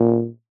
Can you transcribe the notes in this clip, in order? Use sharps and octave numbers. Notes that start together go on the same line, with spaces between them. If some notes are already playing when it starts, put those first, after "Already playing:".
Already playing: A#2